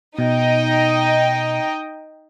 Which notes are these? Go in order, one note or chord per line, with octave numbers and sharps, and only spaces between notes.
B2 D#4 D#5 G5